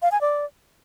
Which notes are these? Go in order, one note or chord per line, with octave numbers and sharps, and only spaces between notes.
F5
G#5
D5